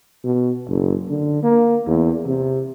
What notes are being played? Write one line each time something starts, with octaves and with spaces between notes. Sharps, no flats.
B2
F#1
D3
A#3
E2
C3